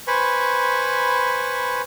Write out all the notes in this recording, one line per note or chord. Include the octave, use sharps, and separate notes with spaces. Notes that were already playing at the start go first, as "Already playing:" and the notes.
B4 C5 G#5 B5 C#6